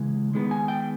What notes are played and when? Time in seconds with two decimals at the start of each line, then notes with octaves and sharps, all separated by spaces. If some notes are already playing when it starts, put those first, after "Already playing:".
Already playing: C#3 E3 G#3
0.34 D#3 G#3 B3
0.51 G#5
0.68 G5